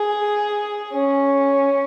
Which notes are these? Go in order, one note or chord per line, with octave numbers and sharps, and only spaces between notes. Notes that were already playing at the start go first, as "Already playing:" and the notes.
Already playing: G#4
C#4